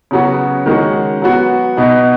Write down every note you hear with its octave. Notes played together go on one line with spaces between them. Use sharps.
C#3 F#3 B3 F#4
D#3 G#3 C#4 F#4
F#3 B3 F#4
B2 B3 D#4